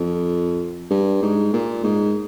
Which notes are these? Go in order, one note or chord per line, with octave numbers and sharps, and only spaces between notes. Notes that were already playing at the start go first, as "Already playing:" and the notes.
Already playing: F2
G2
G#2
A#2
G#2